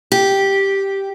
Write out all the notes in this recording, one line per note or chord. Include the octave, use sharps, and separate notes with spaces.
G4